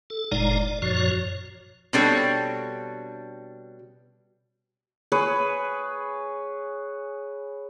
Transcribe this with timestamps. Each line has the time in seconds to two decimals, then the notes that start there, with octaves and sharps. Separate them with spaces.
0.10 A4
0.32 F#1 A#2 G#3 D#4 D5 A#5
0.60 D5
0.82 F#2 A#2 F3 F#4 C#5
1.93 B2 G3 C4 D4 A4 C#5
5.12 G#4 B4 C#5